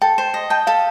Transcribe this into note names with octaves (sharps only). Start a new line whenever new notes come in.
A4 G5
C5
D#5
G5 A5
A4 F5